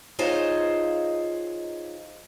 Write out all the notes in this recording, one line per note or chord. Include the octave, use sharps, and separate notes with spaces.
D#4 F4 G#4 C5 C#5